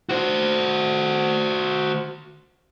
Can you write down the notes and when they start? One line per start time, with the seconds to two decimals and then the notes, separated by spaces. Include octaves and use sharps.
0.09 F#4 C5